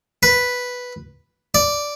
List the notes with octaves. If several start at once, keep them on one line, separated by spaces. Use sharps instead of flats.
B4
D5